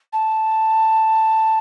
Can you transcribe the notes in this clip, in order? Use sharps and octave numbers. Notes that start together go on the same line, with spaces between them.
A5